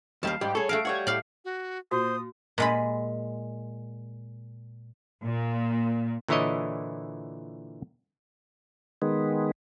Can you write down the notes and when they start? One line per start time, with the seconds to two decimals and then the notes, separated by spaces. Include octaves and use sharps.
0.23 D#2 G3 F5 A5
0.41 G#2 G3 G4
0.55 G#4 A4 C#5
0.69 A3 F#4 F5 D7
0.85 G3 C#5 F#5 G#6
1.07 A2 D5 F5
1.45 F#4
1.91 A#2 F#4 C5 D#6
2.58 A#2 G#3 B5
5.24 A#2
6.28 A#2 D3 E3 E4 C#5 D#5
9.02 D#3 G#3 B3